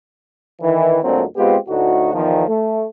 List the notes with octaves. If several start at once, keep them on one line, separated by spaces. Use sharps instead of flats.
D#3 E3
D2 A#2 D3 F#3 G#3 C4
G#3 B3 C4 F4 G4
D2 A2 D#4 F#4
E2 D#3 F3
A3